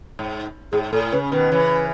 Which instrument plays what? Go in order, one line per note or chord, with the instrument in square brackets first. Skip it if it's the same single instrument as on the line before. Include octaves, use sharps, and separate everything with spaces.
[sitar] G#2
[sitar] G#2 [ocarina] G#4
[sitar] A2 [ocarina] A4
[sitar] C#3 [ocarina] B4
[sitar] B2 D#3 [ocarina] B4
[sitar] C#3 E3